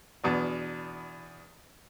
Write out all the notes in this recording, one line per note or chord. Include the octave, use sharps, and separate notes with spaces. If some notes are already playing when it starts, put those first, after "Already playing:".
E2 B2 D4